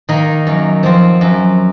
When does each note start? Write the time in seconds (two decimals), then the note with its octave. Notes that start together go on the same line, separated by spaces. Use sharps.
0.09 D#3 A#3 D#4
0.47 F#2
0.83 F3 C4
1.21 F#2